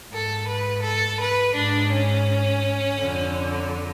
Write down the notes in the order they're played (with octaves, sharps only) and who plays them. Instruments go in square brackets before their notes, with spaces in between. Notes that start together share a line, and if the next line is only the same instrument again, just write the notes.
[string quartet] G#2 A4
B4
A4
B4
G#2 D4
C#4
F2 D3